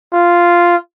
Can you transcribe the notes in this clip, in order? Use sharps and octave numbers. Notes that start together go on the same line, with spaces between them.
F4